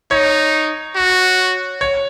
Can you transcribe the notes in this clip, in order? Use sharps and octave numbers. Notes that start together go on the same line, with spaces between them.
D#4 C#5
F#4
C#5